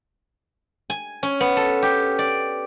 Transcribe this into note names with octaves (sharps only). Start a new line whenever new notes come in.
G#5
C#4
B3
A4
G4
D5